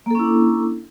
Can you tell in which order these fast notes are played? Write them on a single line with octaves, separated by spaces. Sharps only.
A#3 A4 C#4 E4 D4